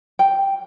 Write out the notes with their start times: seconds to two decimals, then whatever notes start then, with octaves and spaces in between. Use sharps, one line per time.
0.19 G5